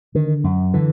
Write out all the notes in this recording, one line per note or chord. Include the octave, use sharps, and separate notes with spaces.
D3 D#3
F#2
D3 E3